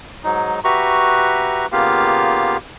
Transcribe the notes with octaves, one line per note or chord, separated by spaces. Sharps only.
G#2 F#3 D#4
F#4 G4 B4 E5 A#5 C#6
C#3 A#3 B3 F4 G4 F5